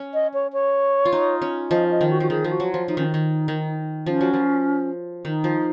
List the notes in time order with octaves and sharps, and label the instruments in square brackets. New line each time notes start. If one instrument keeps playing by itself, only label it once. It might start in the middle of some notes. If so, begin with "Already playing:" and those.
Already playing: [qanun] C#4
[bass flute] D#5
C#5
C#5
[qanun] F4
D#4
C#4
[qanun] F3 [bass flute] D#5
[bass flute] D#5
[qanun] D#3
[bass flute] F#4
[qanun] F3 [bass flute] F#4
[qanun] D#3 [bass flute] G#4
[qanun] F3
[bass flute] F#4
[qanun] F#3
[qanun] F3 [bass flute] F4
[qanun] F3 [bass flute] D#4
[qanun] D#3 [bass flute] C#4
[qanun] D#3 [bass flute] D#4
[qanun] D#3
[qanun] F3 [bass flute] C#4
[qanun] F#3
F3
[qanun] D#3 [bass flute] D#4
[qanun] F3